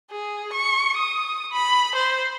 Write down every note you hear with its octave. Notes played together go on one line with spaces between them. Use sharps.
G#4
C#6
D#6
B5
C5